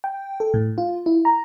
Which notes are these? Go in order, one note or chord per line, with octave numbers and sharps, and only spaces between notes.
G5
A4
A2
F4
E4
A#5